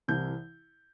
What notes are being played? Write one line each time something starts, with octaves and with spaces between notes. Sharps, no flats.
C2 C3 E3 G6